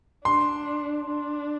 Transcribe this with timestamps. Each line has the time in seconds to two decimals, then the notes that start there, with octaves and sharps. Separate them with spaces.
0.25 D4 C6
1.07 D4